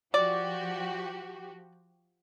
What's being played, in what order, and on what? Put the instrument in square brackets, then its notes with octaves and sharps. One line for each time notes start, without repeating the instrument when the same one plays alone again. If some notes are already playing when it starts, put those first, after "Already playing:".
[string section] F3 F#4 G4 [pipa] D5